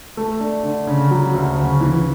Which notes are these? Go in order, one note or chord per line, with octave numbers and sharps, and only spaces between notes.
A3
D4
D3
C#3
F#3
D2
C#3
E3